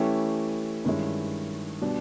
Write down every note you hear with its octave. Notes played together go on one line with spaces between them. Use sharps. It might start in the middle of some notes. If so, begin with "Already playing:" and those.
Already playing: E3 A3 C#4 E4 G4
G2 D#3 G#3 C#4 E4
B2 G3 B3 D4